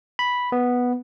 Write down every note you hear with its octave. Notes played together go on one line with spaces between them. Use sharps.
B5
B3